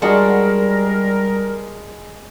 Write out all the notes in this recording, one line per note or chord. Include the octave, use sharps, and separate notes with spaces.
G3 G#3 D4 F#4 G#4 A#4